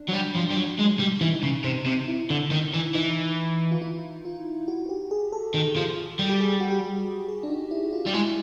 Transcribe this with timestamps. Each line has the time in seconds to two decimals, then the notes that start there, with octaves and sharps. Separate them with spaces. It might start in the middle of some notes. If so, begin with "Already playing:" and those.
Already playing: D4
0.08 F#3
0.13 G3
0.35 F3
0.50 G3
0.56 F#3
0.79 G#3
0.99 G3
1.21 E3 D#4
1.43 C#3
1.64 C3
1.86 C3
2.08 E4
2.30 D3
2.51 D#3
2.74 E3
2.94 E3 D#4
3.71 F4
3.82 E4
4.25 F4
4.68 F#4
4.86 F#4
4.89 G4
5.11 G#4
5.32 A4
5.54 D#3 A4
5.76 F3
6.19 G3
6.29 G4
6.41 G#4
6.60 F#4
6.71 G4
7.28 G#4
7.43 D4
7.49 D#4
7.71 E4
7.93 F4
8.07 G3
8.14 G#3 E4